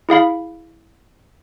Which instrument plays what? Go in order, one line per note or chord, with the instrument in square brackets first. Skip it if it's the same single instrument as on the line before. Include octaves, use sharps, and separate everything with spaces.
[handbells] E4 G#4 F5 B5